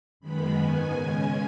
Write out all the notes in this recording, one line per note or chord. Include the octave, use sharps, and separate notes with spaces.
F#2 D#3 G#3 B3 B5
G#2 D#3 B3 G#5
C#3 G#3 C#4